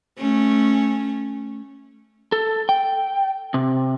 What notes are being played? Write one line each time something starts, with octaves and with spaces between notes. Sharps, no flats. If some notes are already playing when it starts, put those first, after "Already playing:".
A3 C#4
A4
G5
C3